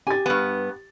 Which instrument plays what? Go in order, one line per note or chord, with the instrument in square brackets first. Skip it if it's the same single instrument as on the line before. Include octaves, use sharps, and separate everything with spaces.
[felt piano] G4 A6 [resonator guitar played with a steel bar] G#5
[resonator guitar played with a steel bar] G2 B3